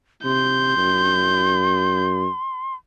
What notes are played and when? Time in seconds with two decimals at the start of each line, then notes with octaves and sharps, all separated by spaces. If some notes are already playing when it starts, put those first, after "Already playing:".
0.24 C3 C6 G6
0.77 F#2